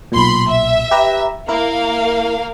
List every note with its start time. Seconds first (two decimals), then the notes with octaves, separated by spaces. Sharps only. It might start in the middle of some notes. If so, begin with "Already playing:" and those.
0.12 B1 A#2 B5 C6
0.47 E5
0.91 G4 B4 A#5
1.48 A#3 E4 A#4 F5